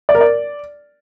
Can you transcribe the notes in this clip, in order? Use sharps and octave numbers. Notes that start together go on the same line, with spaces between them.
D5
A#4
D5